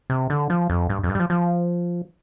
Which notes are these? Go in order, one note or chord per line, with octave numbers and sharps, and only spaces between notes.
C3
D3
F3
F2
G2
F2
G2
G3
F3
F3